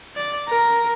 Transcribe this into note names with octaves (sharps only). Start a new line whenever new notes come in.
D5
A#4